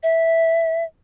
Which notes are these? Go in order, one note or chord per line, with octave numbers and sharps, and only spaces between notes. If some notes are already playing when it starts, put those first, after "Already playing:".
E5